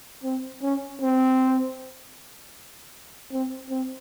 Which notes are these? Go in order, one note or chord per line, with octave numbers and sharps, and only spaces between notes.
C4
C#4
C4
C4
C4